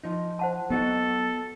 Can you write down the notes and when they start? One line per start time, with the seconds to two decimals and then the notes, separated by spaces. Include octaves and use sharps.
0.04 F3 D#4
0.39 C5 F#5 A5
0.70 F#3 B3 D#4 F#4 A4